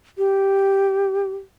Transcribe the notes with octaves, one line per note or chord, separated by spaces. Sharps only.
G4